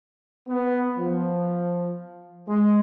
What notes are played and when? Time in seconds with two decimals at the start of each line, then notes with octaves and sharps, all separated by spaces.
0.48 B3
0.98 F3
2.48 G#3